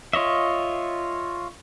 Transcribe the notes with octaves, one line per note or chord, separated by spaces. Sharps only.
F4 C#5 D#5 E5